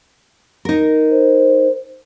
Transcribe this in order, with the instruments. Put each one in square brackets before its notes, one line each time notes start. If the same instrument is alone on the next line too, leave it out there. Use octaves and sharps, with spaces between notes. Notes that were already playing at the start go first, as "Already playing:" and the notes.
[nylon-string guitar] D#4 A#4
[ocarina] C5